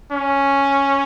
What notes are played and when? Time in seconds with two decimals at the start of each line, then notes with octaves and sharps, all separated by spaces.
0.12 C#4